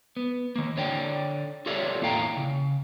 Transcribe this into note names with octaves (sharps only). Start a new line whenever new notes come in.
B3
D#3 A#3
D3 C#5 D5 G5
F4 G4 A4 C#5 D5 E5
E2 A2 A#3 F5 G5 A#5
C#3